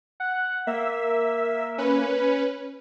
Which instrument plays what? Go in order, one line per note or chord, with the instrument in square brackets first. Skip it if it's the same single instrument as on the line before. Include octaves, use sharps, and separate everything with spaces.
[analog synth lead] F#5
[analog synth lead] A#3 [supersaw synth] E5
[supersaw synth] C#4 B4